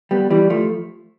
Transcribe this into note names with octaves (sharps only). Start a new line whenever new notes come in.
G3 B3
E3 G3
F3 A3